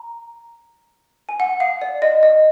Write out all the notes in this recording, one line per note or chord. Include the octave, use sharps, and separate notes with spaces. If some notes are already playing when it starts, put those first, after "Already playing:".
Already playing: A#5
G#5
F#5
F5
D5
D#5
D#5